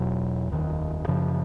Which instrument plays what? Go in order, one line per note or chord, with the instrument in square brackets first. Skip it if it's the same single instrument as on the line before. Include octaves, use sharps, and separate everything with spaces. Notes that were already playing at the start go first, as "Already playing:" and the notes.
Already playing: [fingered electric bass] E1 E2 B2 F#3
F1 D#2 D#3
F#2 C#3 F3